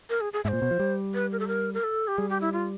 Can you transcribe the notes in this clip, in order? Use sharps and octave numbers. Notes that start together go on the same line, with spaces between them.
A#4
G#4
G#4
G#2 E5
A#2 C5
B2
F3
G3
B4
A#4
A4
A#4
A#4
A4
G4
G3 G#4
G4
E4
F4